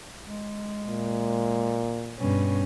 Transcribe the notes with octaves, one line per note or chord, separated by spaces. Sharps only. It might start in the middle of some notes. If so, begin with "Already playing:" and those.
G#3
A#2
G2 B2 C#4